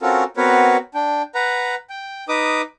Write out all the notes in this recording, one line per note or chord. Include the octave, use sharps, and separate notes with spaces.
C4 C#4 F4 F#4 A4 A#4
B3 C4 F#4 A#4 B4 C#5
D4 G5
B4 F#5 A#5
G5
D#4 B4 D6 D#6